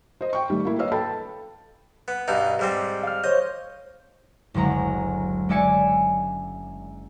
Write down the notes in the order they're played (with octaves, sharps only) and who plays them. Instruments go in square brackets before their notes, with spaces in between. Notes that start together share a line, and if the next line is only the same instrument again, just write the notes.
[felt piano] C5 D#5
G5 C#6
D#3 G3 A3
A#3 E4
B4 C#5 D#5 F5 E6
A4 G5 A5 B5
[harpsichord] B3
G2 B2 D#4
G#2 G3 C4
[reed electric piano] F5 F6
[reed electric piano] C5 C#5 G6 [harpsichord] D#5
[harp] F#1 D2 F#3 G#3 A#5
G#3 C#4 D5 E5 G#5 C#7